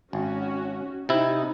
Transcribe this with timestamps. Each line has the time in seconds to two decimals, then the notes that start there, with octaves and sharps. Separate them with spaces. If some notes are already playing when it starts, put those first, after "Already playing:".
0.13 G#1 C#4 F#4
1.09 C3 D#4 E4